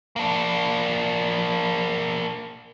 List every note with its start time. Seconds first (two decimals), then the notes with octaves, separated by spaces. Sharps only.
0.16 A#3 D4